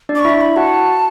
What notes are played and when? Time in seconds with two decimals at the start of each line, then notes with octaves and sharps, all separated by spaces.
0.09 D4 D5
0.15 D6
0.19 C#6
0.25 E4 E5
0.36 C#6
0.41 B5
0.56 F#4 F#5 A5